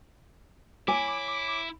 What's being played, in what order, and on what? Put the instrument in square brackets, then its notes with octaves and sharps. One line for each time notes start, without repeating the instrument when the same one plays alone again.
[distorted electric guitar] E4 [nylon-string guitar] C#5 G#5 [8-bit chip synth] D6